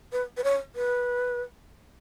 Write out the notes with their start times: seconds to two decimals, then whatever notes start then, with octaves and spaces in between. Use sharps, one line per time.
0.12 B4
0.37 B4
0.44 C#5
0.76 B4